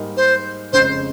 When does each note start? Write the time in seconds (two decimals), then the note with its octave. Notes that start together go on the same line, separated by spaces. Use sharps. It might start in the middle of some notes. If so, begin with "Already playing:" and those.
Already playing: G#2 G3 A#3 D#4
0.17 C5
0.73 F1 F2 C#3 G#3 C#4 C5